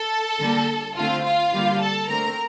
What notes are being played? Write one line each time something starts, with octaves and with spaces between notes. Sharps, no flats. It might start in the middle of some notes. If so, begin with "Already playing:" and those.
Already playing: A4 A5
D3 G3 A#3
D3 A3 C4 F4 F5
F4 F5
D3 G3 A#3
A4 A5
D3 A3 C4 A#4 A#5